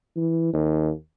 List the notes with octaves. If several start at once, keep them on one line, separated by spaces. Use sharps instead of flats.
E3
D#2